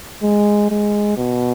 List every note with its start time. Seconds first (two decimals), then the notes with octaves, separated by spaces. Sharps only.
0.23 G#3
0.70 G#3
1.17 B2